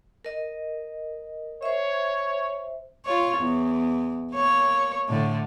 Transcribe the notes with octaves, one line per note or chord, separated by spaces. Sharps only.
A#4 D#5
C5 C#5 E5
F4 C#5
E2
A#3 C#5
A2 D3